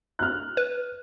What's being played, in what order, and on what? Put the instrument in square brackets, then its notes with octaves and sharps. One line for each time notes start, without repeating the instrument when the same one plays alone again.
[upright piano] F6 F#6
[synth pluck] B4